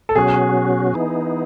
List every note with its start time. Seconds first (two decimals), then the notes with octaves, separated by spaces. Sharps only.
0.09 A4
0.15 B2 F#3 C#4 F#4 G#4
0.94 E3 B3 D#4